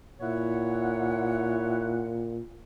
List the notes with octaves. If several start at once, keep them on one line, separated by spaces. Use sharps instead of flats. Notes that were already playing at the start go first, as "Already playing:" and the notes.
A#2 E4 C#5 F#5